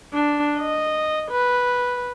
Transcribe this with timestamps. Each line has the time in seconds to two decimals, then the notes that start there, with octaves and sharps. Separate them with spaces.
0.14 D4
0.58 D#5
1.31 B4